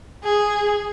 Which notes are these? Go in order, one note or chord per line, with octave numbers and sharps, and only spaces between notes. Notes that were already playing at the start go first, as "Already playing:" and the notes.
G#4